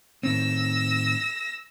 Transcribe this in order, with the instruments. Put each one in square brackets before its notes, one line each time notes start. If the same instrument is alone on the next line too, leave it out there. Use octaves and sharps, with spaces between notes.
[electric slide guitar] A2 D#3 C4 [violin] E6 A#6